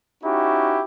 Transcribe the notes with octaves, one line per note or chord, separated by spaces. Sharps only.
C#4 D#4 E4 F#4 G4